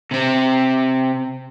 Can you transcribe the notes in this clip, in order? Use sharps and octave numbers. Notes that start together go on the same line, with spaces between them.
C3 C4